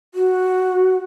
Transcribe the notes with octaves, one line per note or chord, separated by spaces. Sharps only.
F#4